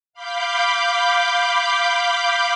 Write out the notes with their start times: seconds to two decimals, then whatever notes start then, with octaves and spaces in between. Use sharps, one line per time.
0.13 F5 B5 D6 G6